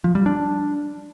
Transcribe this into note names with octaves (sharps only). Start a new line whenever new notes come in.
F3
G3
D4